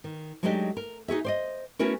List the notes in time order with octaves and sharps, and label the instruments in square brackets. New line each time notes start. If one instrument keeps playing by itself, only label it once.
[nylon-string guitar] D#3
F#3 G#3 A3 D4 D#4 G4
A#4
D#4 F#4 G#4 E5
C5 D5 D#5
A3 B3 C#4 E4 F#4 A#4